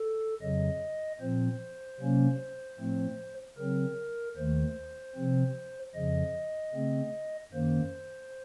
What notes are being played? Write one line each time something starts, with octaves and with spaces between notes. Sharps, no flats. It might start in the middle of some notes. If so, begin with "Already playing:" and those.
Already playing: A4
F2 C#3 F#3 D#5
A#2 F3 C4 C5
C3 F#3 A#3 C#4
A2 F3 A3 C4
C#3 F#3 C4 A#4
D#2 D#3 A3 C5
C3 F3 C4
F2 C#3 F3 D#5
C#3 A3 C4
F#2 D#3 A#3 C5